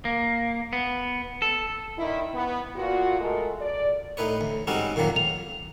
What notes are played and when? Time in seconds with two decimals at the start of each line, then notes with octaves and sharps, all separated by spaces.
0.05 A#3
0.73 B3
1.42 A4
1.98 D3 D#3 E4
2.34 B3
2.76 A#2 F4 F#4
3.20 B2 G#3 A3 A4 A#4
3.61 D5
4.17 A2 D#4 B4 C#5
4.41 D2
4.67 G#2 G3 C4 C#4 D#4 F#4
4.96 F2 A#2 D#3 F#3 A#3
5.16 F7